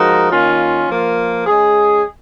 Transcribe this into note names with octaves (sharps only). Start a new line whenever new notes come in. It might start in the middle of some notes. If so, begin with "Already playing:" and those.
Already playing: F3 G#3 D#4 F#4 A#4
D#3 A#3 C#4 F4
F3 A#3 F4
G#3 C#4 G#4